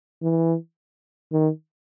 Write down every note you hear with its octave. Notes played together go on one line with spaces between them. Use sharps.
E3
D#3